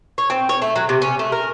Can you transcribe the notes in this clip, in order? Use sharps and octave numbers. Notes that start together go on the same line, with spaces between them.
C#5
C4
C#5
A3
F#3
C3
C#4
A3
A#4